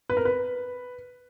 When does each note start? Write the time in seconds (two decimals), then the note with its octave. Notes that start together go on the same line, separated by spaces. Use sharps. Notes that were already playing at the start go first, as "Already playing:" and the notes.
0.10 B4
0.17 A#4
0.25 B4